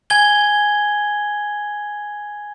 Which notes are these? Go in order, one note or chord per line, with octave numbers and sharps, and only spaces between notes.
G#5 G#6 G7